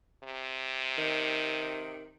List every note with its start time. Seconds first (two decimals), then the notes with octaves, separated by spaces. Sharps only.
0.24 C3
0.97 D#3